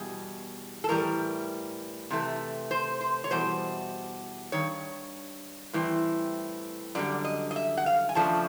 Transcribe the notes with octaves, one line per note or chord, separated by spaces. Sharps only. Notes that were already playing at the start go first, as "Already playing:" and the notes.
Already playing: E2 B2 G3 G#4
A4
A2 E3 G3 A#4
C3 E3 A3
C5
C5
C#5
E2 B2 G3 C5
G2 D#3 C#5
A2 E3 G3 C4
F#2 D3 G3 D5
D#5
D#5
E5
F#5
F5
G#5
C#3 F3 A3 D4 A5